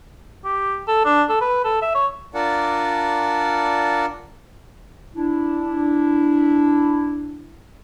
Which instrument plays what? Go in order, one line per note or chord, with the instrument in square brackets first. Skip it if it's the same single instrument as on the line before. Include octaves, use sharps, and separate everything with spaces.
[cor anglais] G4
A4
D4
A4
B4
A4
E5
C#5
[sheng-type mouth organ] D4 F4 A#4 D5 F#5 A5
[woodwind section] D4 E4